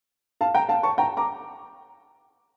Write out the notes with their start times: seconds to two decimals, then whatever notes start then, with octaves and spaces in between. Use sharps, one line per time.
0.41 F5 A5
0.55 G5 A#5
0.69 F5 A5
0.83 A5 C#6
0.98 G5 A#5
1.17 A#5 D6